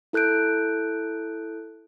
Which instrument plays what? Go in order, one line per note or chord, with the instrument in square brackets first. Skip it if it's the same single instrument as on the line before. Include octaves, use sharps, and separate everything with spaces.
[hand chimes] E4 A4 F#6 G6 D7